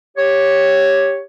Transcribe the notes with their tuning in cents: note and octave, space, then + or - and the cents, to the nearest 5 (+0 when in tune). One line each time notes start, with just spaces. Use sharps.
G4 +0 C#5 +0